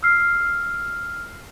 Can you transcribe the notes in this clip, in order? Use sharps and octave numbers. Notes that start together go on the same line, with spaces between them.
E6 F6 C7